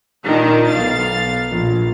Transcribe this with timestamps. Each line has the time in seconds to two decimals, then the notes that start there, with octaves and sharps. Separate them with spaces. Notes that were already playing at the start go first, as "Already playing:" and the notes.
0.23 A#2 D#3 D4
0.68 B1 F5 A6
1.50 A#1